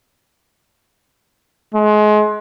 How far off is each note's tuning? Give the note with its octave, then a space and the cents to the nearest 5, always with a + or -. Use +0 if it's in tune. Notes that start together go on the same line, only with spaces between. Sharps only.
G#3 +30